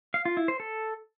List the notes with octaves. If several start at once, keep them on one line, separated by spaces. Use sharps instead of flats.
F5
F4
E4
C5
A4